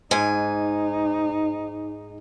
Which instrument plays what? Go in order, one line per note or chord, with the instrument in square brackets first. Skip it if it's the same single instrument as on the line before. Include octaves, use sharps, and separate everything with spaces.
[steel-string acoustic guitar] G#2 G#5 [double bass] D#4